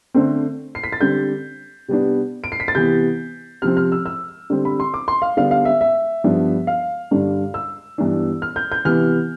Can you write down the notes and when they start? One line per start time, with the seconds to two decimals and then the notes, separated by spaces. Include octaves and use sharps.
0.14 D3 A3 C4
0.75 C7
0.84 B6
0.92 A6
1.01 D3 G3 C4 G6
1.88 C3 G3 B3 D4
2.44 D7
2.52 C7
2.60 B6
2.68 A6
2.75 C3 E3 B3 G6
3.62 C3 F3 C4 F6
3.77 F6
3.92 E6
4.06 E6
4.50 D3 G3 C4
4.65 B5
4.80 C6
4.94 D6
5.08 C6
5.22 F5
5.37 D3 G3 B3 D4 F5
5.51 F5
5.65 E5
5.81 E5
6.24 G2 F3 B3 D4
6.67 F5
7.11 G2 D3 G3 D4
7.54 E6
7.98 G2 E3 B3 D4
8.42 F6
8.56 G6
8.72 G6
8.85 C3 E3 B3 F6